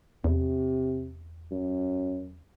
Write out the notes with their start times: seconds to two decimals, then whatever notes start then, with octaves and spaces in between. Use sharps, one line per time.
0.24 E2 C3
1.51 F#2